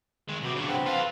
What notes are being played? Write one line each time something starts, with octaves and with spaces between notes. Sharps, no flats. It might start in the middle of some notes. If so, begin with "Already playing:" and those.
D#3 G#3
C3 B3 F#4 G4
G2 C#3 C#6
C4 B4 F#5
F4 A4 F5